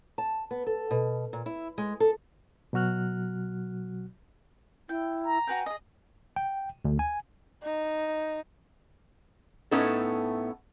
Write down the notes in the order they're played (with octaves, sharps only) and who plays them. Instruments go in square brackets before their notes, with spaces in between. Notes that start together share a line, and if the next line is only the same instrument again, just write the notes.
[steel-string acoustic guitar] A5
B3
A4
B2
A#2
E4
G#3
A4
[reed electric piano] B2 F#3 F#4 F6 F#6
[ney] E4 [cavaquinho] G5
[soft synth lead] A#5
[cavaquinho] F#4 B4 G5 [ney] G#5
[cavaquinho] G#4 D#5
[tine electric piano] G5
D2
G#5
[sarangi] D#4
[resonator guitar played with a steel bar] A2 A3 B3 C#4 D#4 A4